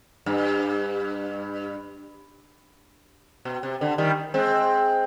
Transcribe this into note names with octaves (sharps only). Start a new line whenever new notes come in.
G2
B2
C3
D3
D#3 G3
G#3 C4